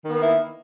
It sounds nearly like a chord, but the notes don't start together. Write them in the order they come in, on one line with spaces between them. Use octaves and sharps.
D#3 B3 A#3 E4